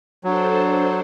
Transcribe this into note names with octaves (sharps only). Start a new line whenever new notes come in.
F#3 D4 A4 C5